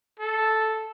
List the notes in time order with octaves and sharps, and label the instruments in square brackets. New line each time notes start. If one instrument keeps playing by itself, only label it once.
[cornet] A4